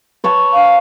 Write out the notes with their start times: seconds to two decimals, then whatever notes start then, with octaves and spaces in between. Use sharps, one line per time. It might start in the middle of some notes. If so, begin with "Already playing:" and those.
0.24 B4 C#5 A5
0.53 F5